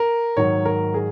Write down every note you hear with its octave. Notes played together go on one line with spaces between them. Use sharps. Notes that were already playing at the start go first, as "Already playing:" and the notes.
Already playing: A#4
G#2 D#3 F#3 C#5
A#4
G#4